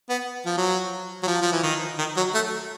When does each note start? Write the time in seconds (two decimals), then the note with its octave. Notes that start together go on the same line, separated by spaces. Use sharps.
0.09 B3
0.46 F3
0.57 F#3
1.23 F#3
1.27 F3
1.42 F3
1.52 E3
1.63 D#3
1.98 D#3
2.17 F#3
2.34 A3